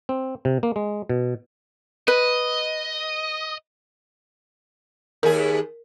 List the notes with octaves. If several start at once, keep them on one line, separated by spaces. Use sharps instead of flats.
C4
C3
A#3
G#3
B2
B4 D#5
D#2 G#4 A#4